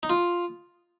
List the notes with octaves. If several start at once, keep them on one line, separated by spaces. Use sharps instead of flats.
D#4
F4